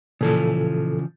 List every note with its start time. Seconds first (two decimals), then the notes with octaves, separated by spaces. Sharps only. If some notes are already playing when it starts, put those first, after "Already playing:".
0.21 A#2 C#3 E3 F3 A4